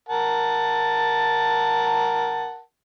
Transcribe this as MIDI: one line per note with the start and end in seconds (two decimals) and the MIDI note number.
0.09 2.60 70
0.09 2.60 78
0.09 2.60 81